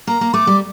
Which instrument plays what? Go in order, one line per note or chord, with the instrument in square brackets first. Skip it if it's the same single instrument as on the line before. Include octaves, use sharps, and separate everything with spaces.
[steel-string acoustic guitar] A#3 [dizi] A#5
[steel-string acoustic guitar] A#3
[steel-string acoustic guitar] A3 [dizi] D6
[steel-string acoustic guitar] G3